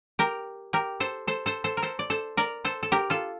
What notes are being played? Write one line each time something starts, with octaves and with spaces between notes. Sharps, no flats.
G4 A#4
G4 A#4
A4 C5
A4 C5
A4 C5
A4 C5
A#4
A4 C5
D5
A4 C5
A#4 D5
A4 C5
A4
G4 A#4
F4 A4